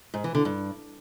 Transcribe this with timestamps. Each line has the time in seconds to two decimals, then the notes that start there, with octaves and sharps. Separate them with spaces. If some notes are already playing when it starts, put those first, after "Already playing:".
0.14 G#2
0.24 E3
0.35 D3
0.45 G2